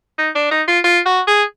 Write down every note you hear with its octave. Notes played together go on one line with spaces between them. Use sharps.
D#4
D4
D#4
F4
F4
F#4
G#4